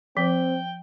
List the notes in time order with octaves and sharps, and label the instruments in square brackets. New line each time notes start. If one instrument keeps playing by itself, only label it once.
[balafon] F3 [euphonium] C4 [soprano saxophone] G5